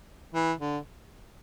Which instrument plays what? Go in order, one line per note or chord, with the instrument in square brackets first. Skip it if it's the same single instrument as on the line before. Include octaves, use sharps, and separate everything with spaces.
[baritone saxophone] E3
D3